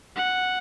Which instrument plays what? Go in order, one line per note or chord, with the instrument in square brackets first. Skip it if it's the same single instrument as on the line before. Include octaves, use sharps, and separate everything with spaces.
[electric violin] F#5